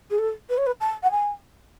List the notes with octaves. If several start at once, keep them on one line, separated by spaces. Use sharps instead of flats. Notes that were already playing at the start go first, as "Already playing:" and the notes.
G#4
A4
B4
C#5
B4
A5
F#5
G#5